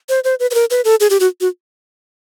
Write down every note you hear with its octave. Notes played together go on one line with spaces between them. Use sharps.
C5
C5
B4
B4
A#4
B4
A4
G#4
G4
F#4
F#4